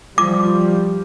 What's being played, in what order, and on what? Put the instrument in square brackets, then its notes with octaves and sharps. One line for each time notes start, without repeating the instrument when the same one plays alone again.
[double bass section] F3 G3 [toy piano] D6